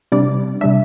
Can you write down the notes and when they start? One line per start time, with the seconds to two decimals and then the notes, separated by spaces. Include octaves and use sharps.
0.12 C3 G3 D4 D5
0.61 C3 G3 D4 E5